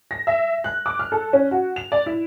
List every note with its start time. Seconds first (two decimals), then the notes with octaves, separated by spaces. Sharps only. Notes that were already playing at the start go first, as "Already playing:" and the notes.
0.11 A#6
0.27 E5
0.64 F#6
0.86 D6
0.99 F6
1.12 A4
1.33 C#4
1.51 F#4
1.76 F7
1.92 D5
2.06 E4